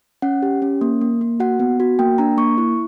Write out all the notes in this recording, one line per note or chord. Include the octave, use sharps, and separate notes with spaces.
C#4 F#5
G4
C#4
A#3
A#3
A#3
F#4 F#5
B3
F#4
A#3 G5
D4 A#5
A#3 C#6
E4